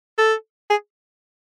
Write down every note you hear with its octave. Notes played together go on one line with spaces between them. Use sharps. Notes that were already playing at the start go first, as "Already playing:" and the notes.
A4
G#4